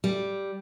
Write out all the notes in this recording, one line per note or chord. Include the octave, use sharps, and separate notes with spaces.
G3